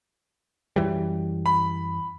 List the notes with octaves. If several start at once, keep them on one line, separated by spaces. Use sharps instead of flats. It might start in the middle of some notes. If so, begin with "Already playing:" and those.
F#2 E3 G3
B5